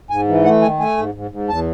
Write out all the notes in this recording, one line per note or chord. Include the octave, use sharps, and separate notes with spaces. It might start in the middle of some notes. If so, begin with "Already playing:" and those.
G#2 G#5
E3
A3 F#5
D#3 G#5
A3 G#5
G#2
G#2
G#2
E2 A5